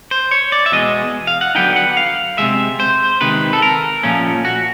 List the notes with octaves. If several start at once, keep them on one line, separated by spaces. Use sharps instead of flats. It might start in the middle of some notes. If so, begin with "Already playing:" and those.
C5
C#5
D5
E5
E2 B2 G#3 D#5
F5
F#5
D3 F#3 B3 D#4 G5
F#5
F5
C3 F3 G#3 E5
C5
C3 D#3 G#3 B4
A4
A#4
A#2 F3 A3 C#4
F#4